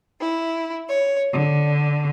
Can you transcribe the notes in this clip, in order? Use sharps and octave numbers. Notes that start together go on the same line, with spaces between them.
E4
C#5
D3